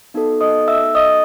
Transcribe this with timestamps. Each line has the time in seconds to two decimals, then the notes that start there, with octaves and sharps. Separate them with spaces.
0.14 B3 D#4 F#4 A4
0.41 D#5 D#6
0.68 E5 E6
0.95 D#5 D#6